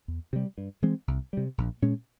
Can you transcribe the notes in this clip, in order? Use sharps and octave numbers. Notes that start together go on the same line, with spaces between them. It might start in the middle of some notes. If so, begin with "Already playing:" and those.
E2
C3 G3
G2
E3 G#3 C4
C2
C3 G3
A#1
A#2 G#3 C#4